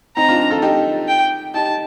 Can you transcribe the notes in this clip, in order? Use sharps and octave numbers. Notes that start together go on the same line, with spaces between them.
C4 D#4 A#5
D4 F4
F4 A4
D#4 G4
G5
D#4 G4 A5